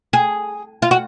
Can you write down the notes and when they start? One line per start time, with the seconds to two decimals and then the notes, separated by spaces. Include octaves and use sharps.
0.13 G#4
0.82 F4
0.91 F#4